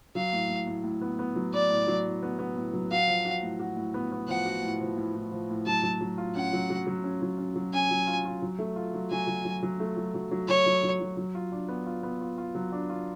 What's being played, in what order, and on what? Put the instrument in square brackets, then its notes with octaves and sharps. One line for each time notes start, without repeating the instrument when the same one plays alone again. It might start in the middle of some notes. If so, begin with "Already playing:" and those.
[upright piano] F#3 [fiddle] F5
[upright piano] A2
A2
A2
A2
B3
B3
F#3
[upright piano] B3 [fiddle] D5
[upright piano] A2
F#3
A2
B3
B3
A2
F#3
[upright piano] F#4 [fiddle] F5
[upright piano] F3
F#4
A2
F#4
A2
B3
B3
[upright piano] F3 [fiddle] F#5
[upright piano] F#4
A2
F3
A2
A2
F3
A2
[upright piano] F#3 [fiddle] A5
[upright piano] F#3
F#3
F4
[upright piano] C#4 [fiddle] F#5
[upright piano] F#3
F#3
F#3
C#4
F#3
C#4
F#3
[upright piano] C#4 [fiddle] G#5
[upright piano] F#3
F4
F4
F#3
A3
F4
F#3
[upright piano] F#3 [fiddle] G#5
[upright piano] F#3
F#3
F#3
A3
F#3
F#3
F#3
[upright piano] F#3 [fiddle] C#5
[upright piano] F#3
F#3
F#3
F#3
F4
D4
B3
F4
B3
F4
F4
F#3
D4
F4